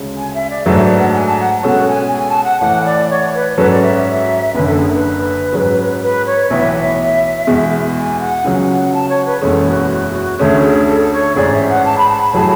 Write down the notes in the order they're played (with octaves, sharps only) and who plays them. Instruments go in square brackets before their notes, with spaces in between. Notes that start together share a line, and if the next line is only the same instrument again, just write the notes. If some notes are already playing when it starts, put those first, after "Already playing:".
Already playing: [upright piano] D2 C#3 G#3
[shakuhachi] G#5
E5
D5
[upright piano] G#2 F#3 A3 D4 A4 [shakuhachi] B4
[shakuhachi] D5
F#5
A5
G#5
A5
F#5
[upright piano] B2 G#3 C#4 F#4 A4 [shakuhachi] F#5
[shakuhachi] G#5
G#5
A5
F#5
[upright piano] A2 E3 A3 [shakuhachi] F#5
[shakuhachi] D5
C#5
B4
[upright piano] G#2 F#3 C#4 F#4 A4 [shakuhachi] B4
[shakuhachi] D5
E5
E5
[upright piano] F#1 F#2 D3 [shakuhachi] B4
[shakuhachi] A4
G#4
B4
[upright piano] G#2 F#3 C#4 G#4
[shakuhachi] B4
C#5
[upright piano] B1 A2 E3 B3 [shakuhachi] E5
[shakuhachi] E5
[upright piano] E2 B2 G#3
[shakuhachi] G#5
F#5
[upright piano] C#2 C#3 F#3 C#4
[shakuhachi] F#5
A5
C#5
B4
[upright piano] F#1 E2 B2 G#3 C#4 [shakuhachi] A4
[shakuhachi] F#4
F#4
F#4
[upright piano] D2 D3 A3 C#4 [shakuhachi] G#4
[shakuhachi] G#4
A4
C#5
[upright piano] A1 G#2 G#3 C#4 G#4 [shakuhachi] D5
[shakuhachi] E5
F#5
A5
B5
A5
B5
[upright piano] A2 F#3 A3 E4 G#4 [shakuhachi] A5